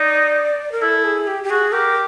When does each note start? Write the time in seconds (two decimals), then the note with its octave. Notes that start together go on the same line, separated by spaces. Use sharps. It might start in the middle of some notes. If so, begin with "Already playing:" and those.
Already playing: D#4 D5
0.72 A#4
0.82 E4 A4
1.04 G#4
1.27 G4
1.44 G4
1.50 F#4 G#4
1.72 G4 A#4